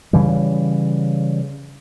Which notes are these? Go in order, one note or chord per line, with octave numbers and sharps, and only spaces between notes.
C#3 E3 G3